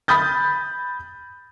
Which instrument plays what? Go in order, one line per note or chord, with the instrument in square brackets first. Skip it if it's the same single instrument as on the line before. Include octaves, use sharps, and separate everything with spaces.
[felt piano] B5 D#6 G6 A6